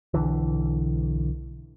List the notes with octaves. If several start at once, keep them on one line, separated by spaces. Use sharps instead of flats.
B1 D3 E3